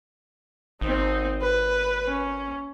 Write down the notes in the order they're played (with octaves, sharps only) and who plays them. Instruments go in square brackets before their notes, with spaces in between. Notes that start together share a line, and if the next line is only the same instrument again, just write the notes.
[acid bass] G#1 [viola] C4 D#4
[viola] B4
C#4